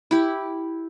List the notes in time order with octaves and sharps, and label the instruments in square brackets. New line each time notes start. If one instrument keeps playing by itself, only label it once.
[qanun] E4 G4